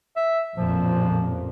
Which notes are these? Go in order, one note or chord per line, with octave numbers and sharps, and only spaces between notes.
E5
A1 F2 A#2 F3